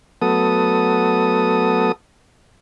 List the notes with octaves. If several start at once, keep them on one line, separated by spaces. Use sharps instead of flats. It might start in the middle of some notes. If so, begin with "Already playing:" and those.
F#3 A3 B3 A4 D#6